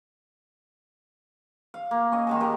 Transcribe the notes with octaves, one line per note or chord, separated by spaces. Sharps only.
F5
A#3
C#4 D#5
D#3 G#3 A5
G4 A#4 D#5